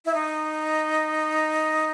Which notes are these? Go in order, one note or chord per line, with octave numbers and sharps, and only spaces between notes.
E4
D#4